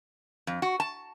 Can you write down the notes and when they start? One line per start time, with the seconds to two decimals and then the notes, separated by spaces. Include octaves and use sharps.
0.47 F2
0.62 F#4
0.80 A5